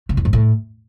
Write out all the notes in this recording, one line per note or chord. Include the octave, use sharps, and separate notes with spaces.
C#3
E2
G#2
A2